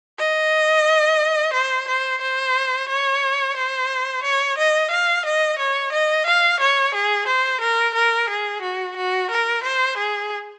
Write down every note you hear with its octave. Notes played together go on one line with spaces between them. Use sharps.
D#5
C5
C5
C5
C#5
C5
C#5
D#5
F5
D#5
C#5
D#5
F5
C#5
G#4
C5
A#4
A#4
G#4
F#4
F#4
A#4
C5
G#4